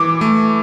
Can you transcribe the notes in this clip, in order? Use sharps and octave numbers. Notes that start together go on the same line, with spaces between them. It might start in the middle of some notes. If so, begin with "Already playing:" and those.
Already playing: E3 D6
A3